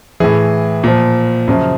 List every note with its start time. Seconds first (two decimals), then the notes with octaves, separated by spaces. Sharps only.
0.20 A2 E3 G#4
0.84 A#2 F3
1.48 F#2 C#3 F3